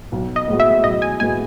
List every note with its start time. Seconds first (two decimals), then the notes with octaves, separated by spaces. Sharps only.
0.12 B1
0.36 D#5
0.48 A2 G#3 B3 F#4
0.60 E5
0.84 B1 D#5
1.02 G#5
1.20 A2 G#3 B3 F#4 G#5